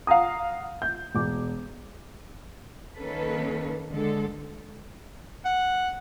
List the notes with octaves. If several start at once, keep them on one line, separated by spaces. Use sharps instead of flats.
F5 F#5 A#5 D#6
G6
E1 D6
D#3 A#3 C#4 A4 B4
D3 G#3 A4
F#5